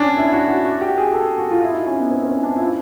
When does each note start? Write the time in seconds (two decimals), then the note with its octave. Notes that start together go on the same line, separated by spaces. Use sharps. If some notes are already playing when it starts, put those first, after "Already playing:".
Already playing: C#4 D4
0.17 E4
0.32 F#4
0.49 F#4
0.65 F#4
0.81 G4
0.98 G#4
1.13 A4
1.38 F#4
1.51 F4
1.62 E4
1.74 D#4
1.87 C#4
1.99 B3
2.11 C4
2.23 C4
2.27 C#4
2.38 C#4
2.43 D4
2.56 E4
2.60 F4